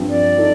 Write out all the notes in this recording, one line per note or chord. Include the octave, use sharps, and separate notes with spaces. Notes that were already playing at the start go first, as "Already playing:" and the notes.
Already playing: G2 F3 C4 F4
D5
D#4 A4